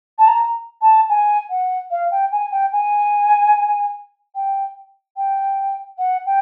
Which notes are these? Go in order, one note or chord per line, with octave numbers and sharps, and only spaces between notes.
A5
A#5
A5
G#5
F#5
F5
G5
G#5
G5
G#5
G5
G5
F#5
G5